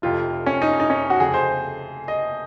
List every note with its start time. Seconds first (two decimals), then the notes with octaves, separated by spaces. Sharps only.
0.02 F1 F2 C3 F4
0.46 C#4
0.62 D#4
0.80 D#4
0.90 C#4
1.10 F#4
1.20 F1 F2 C#3 G#4
1.34 C5
2.08 D#5